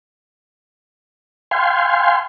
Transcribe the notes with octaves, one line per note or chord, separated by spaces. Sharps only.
F5 G5 G#5 C6